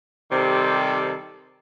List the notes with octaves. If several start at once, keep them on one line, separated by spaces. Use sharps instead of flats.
C3 D#3 G3 C4 A4